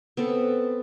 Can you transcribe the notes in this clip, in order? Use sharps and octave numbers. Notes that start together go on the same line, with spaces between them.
B3 C4 A4